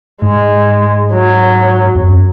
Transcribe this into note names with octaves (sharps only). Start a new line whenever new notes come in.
G#2 G#3
F#3
E2
F#2